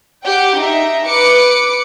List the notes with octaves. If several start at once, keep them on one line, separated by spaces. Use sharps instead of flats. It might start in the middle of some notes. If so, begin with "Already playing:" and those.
G4 F#5 G5
D#4 E5
B4 D6 C#7